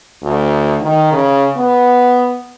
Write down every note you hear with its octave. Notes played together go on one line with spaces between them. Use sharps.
D2
D#3
C#3
B3